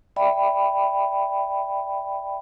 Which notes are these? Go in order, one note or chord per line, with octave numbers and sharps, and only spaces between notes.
D5 E5 G5 B5